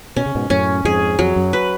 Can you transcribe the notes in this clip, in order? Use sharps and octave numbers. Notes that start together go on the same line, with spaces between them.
B2 C#4
C#3
G#2 B2
F#2 A2 C#4
F2 G#2 G#4
F2 F#3
F#2
B4